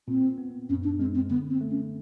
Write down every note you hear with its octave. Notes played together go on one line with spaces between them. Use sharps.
A#2 C4
B3
F#2 C#4
D4
G#3 C4
C4
D3 B3
C4
A3
C#4